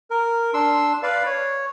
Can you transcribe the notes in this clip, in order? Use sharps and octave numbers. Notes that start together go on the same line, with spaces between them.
A#4
D4 C6 E6
B4 D5 F5
C#5